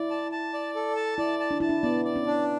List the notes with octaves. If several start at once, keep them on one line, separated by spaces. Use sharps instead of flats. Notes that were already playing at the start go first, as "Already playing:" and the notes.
Already playing: E4 D5
A5
A5
D5
A4
A5
E4 D5
A5
D4
E4 A5
D4
B3 D5
D5
C#4
D4